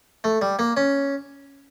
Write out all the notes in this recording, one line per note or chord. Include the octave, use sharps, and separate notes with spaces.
A3
G3
A#3
C#4